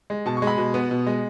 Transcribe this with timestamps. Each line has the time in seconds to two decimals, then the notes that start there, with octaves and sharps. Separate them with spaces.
0.10 G#3
0.26 B2 A5
0.37 C#6
0.42 G#3
0.47 B5
0.58 B2
0.74 B3
0.91 B2
1.07 G#3